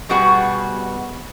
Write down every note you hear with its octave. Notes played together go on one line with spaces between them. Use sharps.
B2 G3 B3 F#4 G#4